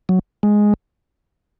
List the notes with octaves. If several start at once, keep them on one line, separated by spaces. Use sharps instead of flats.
F#3
G#3